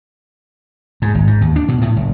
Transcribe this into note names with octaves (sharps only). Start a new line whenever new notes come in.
G#2
G#1
G#2
D#2
D4
B2
A2
F#1